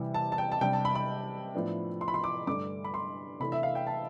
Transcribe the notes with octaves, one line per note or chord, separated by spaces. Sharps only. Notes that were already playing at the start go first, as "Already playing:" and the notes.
Already playing: C3 E3 G3
A5
A5
G5
A5
C3 G3 D4 G5
A5
B5
B5
A2 F3 B3 D4
C6
B5
C6
D6
G2 D3 A3 D4 D6
B5
C6
C3 E3 A3 D4 B5
E5
F5
G5
A5